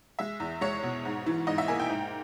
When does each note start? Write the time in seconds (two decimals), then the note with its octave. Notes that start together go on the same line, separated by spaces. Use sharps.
0.19 G#3 E5
0.40 E2
0.61 G#3 C#5
0.83 B2
1.05 G#2
1.26 E3
1.47 G#2 D#5
1.58 E5
1.68 A#3 G#5
1.80 G5
1.89 G#2